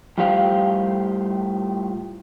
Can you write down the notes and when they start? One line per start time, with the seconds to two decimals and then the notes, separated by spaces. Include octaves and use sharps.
0.18 A2 G3 F4 G4 C5 F5